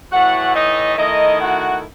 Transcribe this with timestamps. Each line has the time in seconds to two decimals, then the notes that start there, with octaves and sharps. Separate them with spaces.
0.12 A2 E3 A3 F#4 F#5
0.55 D#4 D#5
0.98 D#3 A3 D#4 E4 D#5
1.41 F#4 F#5